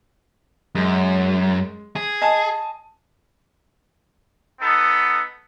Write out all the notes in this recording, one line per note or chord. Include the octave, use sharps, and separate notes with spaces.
F#2 G#3
G#4
D#5 G#5 A5
B3 D#4 A4